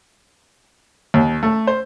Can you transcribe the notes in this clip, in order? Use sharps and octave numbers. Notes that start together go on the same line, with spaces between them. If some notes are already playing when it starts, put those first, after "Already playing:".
D#2
A3
C5